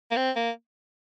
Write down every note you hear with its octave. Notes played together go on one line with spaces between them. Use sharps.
A#3
C4
A#3